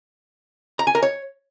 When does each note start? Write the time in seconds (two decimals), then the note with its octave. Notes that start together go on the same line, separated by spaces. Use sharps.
0.79 A#5
0.87 G#5
0.95 A#4
1.03 C#5